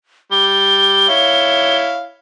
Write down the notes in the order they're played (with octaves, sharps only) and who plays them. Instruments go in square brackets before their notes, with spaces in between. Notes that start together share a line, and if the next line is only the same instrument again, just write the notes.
[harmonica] G3 [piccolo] G7
[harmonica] E4 C#5 F5